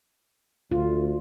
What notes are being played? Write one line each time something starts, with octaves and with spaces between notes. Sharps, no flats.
D2 F4